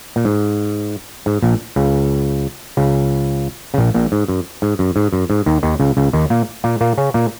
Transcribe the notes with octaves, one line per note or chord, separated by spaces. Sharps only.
A#2
G#2
G#2
A#1 A#2
C#2 C#3
C#2 C#3
C#3
A#1 A#2
A#1 A#2
G#2
F#2
G#2
F#2
G#2
F#2
G#2
D#2 D#3
D#2 D#3
C#2 C#3
C#2 C#3
D#2 D#3
A#2 A#3
A#2 A#3
A#2 A#3
C#3 C#4
A#2 A#3